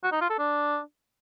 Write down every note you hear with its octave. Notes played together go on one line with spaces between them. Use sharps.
F#4
D#4
F4
A4
D4